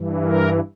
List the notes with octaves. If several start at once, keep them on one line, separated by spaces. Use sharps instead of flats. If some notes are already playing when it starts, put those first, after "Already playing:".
Already playing: G2 E3
A#4